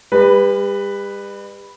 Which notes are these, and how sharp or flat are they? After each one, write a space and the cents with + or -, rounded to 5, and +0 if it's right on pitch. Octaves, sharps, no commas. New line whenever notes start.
G3 +40 B4 +0